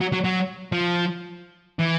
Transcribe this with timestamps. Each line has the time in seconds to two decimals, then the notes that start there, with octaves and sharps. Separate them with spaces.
0.01 F#3
0.13 F#3
0.24 F#3
0.72 F3
1.79 E3